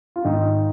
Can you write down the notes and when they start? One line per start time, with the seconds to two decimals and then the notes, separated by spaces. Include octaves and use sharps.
0.16 F4
0.24 G#2 D#3 D#4